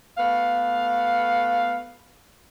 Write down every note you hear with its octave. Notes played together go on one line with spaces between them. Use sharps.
A3 B3 F5